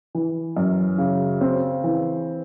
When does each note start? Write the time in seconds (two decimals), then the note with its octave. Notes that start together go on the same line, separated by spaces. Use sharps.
0.15 E3
0.57 F#2
0.98 C#3
1.41 C4
1.84 E3